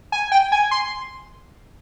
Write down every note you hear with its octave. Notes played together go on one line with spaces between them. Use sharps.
G#5
G5
G#5
C6